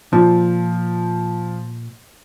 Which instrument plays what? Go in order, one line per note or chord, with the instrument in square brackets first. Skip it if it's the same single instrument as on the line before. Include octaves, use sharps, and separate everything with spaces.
[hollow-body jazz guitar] A#2 [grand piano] F3